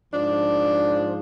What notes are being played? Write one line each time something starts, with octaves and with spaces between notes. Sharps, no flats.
G#2 F3 D4